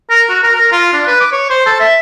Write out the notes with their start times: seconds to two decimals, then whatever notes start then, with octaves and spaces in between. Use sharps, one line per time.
0.10 A#4
0.29 F#4
0.44 A#4
0.55 A#4
0.72 F4
0.93 D4
1.07 B4
1.21 D6
1.32 C#5
1.50 C5
1.66 A4
1.80 E5